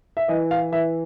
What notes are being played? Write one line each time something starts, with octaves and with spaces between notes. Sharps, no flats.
E5
E3 D#5
F5
E3 E5